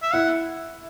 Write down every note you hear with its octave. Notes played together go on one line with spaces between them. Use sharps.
E5
E4 F#5